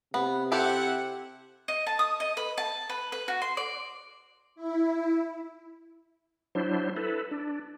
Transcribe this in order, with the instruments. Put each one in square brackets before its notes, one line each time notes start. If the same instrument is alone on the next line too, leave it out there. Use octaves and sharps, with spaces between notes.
[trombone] C3 [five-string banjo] B3
[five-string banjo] C4 G4 A4 [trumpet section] E4 F#5
[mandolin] D#5
A5
D#6
D#5
B4
A5
B4
B4
F#4
C6
D5
[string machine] E4
[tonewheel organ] F#3 D4 E4 C5
E4 A4 B4
D4